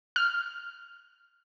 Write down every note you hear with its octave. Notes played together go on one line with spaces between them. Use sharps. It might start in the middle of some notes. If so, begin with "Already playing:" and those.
F6